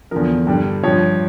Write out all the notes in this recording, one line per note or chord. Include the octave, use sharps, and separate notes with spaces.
E2 D3 F3 A#4
G2 D3 G3
G2 F3 C#5